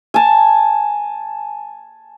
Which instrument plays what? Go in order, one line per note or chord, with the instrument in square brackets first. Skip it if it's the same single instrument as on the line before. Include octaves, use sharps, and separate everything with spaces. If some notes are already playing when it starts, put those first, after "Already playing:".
[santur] G#5 A5